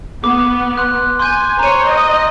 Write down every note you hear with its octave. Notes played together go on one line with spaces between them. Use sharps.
B3 D6
C6 F#6
G#5 C6 G6
C5 C#5 A#5 D#7
D#5